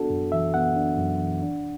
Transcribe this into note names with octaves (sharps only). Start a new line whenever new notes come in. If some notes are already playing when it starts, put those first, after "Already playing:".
Already playing: B3 D4 F#4 A4
F#2
E3 E5
B3 F#5
D4
F#2
E3
D4